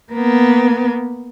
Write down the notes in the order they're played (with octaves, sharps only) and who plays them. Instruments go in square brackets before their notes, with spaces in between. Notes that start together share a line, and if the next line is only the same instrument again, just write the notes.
[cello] A#3 B3